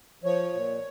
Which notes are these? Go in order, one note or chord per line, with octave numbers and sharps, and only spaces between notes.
F3 C#5
A#2